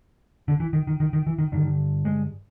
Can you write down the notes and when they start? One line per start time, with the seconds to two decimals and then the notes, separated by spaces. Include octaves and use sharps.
0.48 D3
0.60 E3
0.73 D#3
0.87 D#3
1.00 D#3
1.13 D#3
1.27 E3
1.38 D#3
1.52 G2 D3 D#3
2.05 G#3